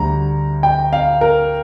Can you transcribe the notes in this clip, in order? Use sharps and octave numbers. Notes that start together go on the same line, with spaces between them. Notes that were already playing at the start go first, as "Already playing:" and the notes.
Already playing: D2 D3 G3 A#5
G5
F5
A#4